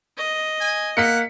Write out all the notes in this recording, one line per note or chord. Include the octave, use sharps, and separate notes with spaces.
D#5
G#5
A#3 F#5 B6 C#7